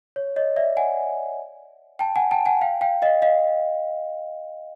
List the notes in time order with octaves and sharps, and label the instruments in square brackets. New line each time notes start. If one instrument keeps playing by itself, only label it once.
[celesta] C#5
C#5 D#5
D5 E5
F#5 G#5
G5 A5
F#5 G#5
G5 A5
F#5 G#5
F5 G5
F5 G5
D#5 F5
D#5 F5